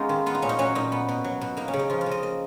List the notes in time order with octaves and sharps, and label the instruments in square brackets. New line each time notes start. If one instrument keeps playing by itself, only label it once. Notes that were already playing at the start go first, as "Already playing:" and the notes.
Already playing: [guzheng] G#3 B3 C#4 D#4 F4
D#3
B3 F4
D#4
A#2 C#4
D#4
F#3 C#4
A#2 D#4
B3
B2
F#3
B2
A#3 D#4
C#4
C#3
D#4
F3 F4
F4
C#3
D#5
A#3 D#5